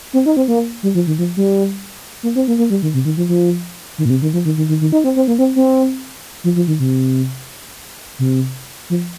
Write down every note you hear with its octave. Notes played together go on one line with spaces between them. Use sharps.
C4
D#4
C4
A#3
G3
F3
D#3
F3
G3
A#3
C4
A#3
A#3
G3
D#3
C3
D#3
F3
F3
D#3
A#2
C3
D#3
F3
D#3
D#3
D#3
D#3
D#4
C4
C4
A#3
C4
C4
F3
F3
D#3
C3
C3
F3